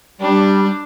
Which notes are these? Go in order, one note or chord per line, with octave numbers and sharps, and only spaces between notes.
G3 D4